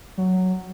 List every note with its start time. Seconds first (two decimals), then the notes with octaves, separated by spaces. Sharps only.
0.18 F#3